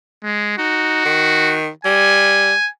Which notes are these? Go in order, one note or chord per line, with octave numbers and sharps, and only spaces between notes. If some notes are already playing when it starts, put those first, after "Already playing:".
G#3
D#4 F#4
D#3
G3 G#5